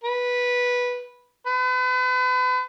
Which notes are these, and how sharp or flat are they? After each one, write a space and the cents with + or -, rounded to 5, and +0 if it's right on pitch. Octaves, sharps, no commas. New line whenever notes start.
B4 -10
B4 +40